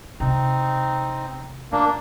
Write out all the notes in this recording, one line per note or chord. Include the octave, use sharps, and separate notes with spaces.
C3 C4 D#4
A#2 A#3 D4